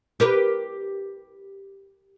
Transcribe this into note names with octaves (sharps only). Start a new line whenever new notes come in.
G4 A#4 B4